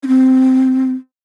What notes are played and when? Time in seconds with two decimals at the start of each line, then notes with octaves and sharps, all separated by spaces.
0.03 C#4
0.08 C4